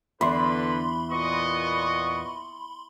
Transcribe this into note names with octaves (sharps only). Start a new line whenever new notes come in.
E2 D3 B4 B5 C6
A#2 B3 D#5 C#6